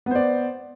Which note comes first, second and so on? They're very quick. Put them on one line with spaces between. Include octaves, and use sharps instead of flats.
B3 C5 D5